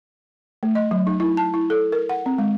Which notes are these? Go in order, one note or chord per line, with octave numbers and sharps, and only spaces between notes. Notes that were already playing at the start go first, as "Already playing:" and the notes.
A3
D#5
F#3
D#4
E4
A5
E4
A4
A#4
F#5
C4
G#3